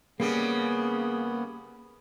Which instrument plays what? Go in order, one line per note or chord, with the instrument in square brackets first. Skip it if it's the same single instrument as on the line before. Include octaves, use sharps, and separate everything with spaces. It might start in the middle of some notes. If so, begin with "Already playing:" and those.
[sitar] C#3 G3 [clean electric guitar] A#3 [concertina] B3 [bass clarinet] G#4